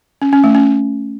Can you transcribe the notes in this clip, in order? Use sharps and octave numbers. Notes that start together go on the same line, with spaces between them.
C#4
C#4
A3
C#4